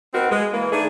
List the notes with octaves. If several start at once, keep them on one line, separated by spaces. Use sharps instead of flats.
B3 C4 D#4 F#4 A#4
G#3
E3 A#3
D#3 A3 D4 G#4